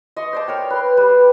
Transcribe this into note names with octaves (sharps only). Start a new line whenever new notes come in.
D#5 C6 C#6
C5 D5 A5
A#4 C#5 G5
B4 C6
G3 B4